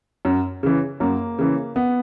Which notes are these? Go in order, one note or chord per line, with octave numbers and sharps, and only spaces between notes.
F#2
C#3 E3
F#2 A#3
C#3 E3
B3